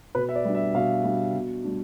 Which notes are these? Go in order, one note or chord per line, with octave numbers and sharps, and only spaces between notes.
B2 B4
E5
D5
G3 D4
E5
B2 F5
G3 D4
B2
G3 D4